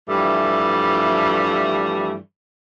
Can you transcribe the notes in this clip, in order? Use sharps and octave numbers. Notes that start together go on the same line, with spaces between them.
G2 E3 F3 G3 A3